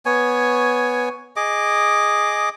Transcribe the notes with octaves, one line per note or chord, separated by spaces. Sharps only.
B3 C#5 G#5
G#4 D#5 D6